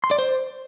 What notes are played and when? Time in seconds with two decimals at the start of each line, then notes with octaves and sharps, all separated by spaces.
0.04 C6
0.11 D5
0.19 C5